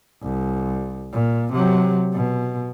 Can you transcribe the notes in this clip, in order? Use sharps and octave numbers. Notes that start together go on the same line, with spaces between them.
C2
A#2
C3 F#3
B2